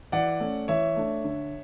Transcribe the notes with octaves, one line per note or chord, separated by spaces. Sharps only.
E3 D5 F#5
A3 C#4
E3 C#5 E5
A3 D4
D3